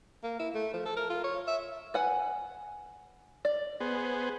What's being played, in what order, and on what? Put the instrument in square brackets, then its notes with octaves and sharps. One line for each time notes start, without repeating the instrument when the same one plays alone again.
[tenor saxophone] A#3
E4
A3
F3
A4
A#4
F4
C#5
E5
[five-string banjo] B4 F#5 G#5
D5
[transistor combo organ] B3 G#4 C5